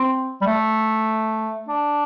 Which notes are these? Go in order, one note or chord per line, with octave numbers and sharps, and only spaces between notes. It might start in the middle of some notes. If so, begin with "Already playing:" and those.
Already playing: C4
G3
A3
D4